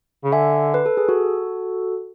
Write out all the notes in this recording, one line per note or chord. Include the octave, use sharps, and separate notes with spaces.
C#3
D3 E5 G#5
B4
A4
G#4
F#4 A4